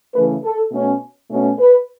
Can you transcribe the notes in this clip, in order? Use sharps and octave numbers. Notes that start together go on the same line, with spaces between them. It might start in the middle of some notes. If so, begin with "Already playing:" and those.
C#3 E3 A3 C#4 B4
A4
B2 A3 C#4
B2 A3 C#4
B4